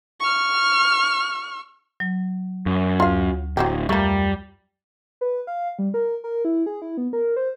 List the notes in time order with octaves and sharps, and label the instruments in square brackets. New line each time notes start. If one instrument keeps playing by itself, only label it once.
[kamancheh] C#6 F6
[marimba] F#3
[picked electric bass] F#2
[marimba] D2 [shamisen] F4 F5
[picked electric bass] D1 [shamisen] F#3 C4 G4
[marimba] F2 A#5 [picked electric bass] G3 [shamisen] A3 A#3
[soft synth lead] B4
F5
G3
A#4
A#4
E4
G#4
E4
B3
A#4
C5